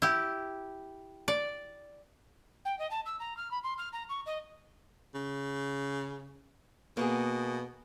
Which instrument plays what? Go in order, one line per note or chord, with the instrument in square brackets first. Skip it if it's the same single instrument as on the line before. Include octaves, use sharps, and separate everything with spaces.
[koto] E4 G4
D5
[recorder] G5
D#5
A5
E6
A#5
F6
B5
C6
F6
A#5
C#6
D#5
[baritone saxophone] C#3
[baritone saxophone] B2 [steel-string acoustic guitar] A#3 B3 G#4